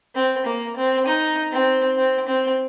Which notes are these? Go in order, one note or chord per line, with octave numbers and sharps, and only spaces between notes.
C4
A#3
C4
D#4
C4
C4
C4